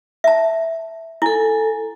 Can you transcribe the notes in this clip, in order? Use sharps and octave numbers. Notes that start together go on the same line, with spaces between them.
E5 A5
E4 A4 G#5